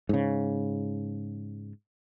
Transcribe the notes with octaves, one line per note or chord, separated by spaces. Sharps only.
G#2 C#3